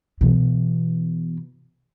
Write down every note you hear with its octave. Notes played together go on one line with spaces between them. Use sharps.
B2 E3